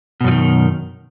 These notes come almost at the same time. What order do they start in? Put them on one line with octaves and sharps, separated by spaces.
B2 F#2 F3 D#3